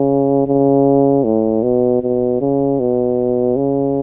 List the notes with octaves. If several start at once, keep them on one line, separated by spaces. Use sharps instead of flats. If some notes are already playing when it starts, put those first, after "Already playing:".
Already playing: C#3
C#3
A2
B2
B2
C#3
B2
C#3